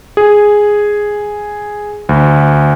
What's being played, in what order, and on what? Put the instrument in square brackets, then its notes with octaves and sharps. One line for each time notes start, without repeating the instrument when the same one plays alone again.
[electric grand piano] G#4
D2